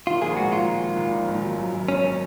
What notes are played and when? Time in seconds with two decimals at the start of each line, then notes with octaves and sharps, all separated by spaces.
0.07 D#3 F4
0.22 A#1 G#4
0.36 G#2 F#4
0.52 G#2 F4
0.68 G#2
0.83 D#3
0.97 A#1
1.12 D#3
1.28 G#1
1.44 F#3
1.58 F#2
1.73 F#2
1.88 F#3 C#4